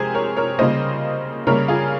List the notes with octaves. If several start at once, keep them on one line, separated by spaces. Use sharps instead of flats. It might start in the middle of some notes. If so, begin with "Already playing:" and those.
Already playing: C3 F3 G#3 G4 G#4 A#4 C5
A#4 C#5
A#4 C#5
C#3 G3 A#3 C5 D#5
C#3 G3 A#3 A#4 C#5
F4 G#4